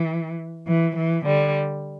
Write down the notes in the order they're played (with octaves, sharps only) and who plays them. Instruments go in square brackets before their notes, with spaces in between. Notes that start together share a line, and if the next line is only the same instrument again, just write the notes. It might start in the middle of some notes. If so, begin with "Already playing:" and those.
Already playing: [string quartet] E3
E3
E3
D3 G3